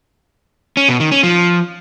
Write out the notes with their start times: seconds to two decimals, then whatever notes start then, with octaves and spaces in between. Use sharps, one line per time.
0.77 C#4
0.88 B2
1.00 D#3
1.12 C#4
1.23 F3